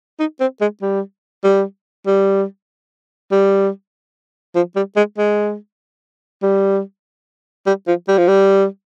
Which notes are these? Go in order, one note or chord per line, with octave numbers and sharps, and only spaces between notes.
D#4
C4
G#3
G3
G3
G3
G3
F3
G3
G#3
G#3
G3
G3
F3
G3
F3
G3